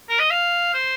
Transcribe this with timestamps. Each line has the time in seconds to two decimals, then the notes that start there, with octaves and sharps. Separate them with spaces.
0.09 A#4
0.19 D#5
0.31 F5
0.74 C5